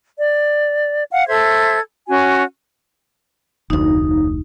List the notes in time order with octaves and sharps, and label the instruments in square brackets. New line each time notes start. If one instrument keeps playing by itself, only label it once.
[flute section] D5
F5 F#5
A4 C5 E5 G#6
C#4 F#4 G#5
[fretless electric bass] F1 D2 [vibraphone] D#4